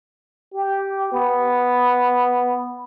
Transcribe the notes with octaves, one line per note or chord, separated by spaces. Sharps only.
G4
B3